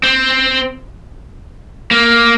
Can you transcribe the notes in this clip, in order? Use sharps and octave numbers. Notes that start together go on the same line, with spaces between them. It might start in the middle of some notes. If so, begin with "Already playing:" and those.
C4
A#3